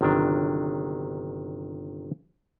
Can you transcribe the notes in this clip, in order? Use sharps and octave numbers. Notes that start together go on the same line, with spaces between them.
G1 C3 D#3 F#3 D4